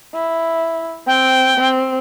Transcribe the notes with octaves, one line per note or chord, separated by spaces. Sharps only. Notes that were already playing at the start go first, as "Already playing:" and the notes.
E4
C4 G5
C4